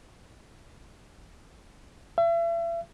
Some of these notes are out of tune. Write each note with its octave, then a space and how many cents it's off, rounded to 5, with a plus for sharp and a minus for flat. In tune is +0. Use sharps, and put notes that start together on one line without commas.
E5 +40